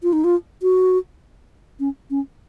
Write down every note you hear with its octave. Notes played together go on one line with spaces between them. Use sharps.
F4
D#4
F4
F#4
C#4
C#4